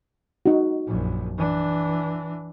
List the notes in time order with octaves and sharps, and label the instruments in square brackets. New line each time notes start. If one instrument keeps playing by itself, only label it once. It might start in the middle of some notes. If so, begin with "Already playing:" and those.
[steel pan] D#4 F#4
[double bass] A#1 F#2
E3 D4